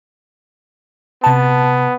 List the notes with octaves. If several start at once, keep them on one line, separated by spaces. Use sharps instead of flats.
C3 B3 A5